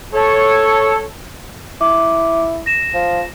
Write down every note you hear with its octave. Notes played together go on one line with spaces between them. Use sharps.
A4 C#5
E4 D6
A#6 E7
F3